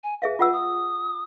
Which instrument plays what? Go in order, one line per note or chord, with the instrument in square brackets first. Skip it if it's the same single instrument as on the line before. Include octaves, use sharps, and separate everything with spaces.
[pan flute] G#5
[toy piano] G#4 E5 F5 [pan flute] B4
[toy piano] F4 F#5 E6 [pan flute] B4
[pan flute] D#6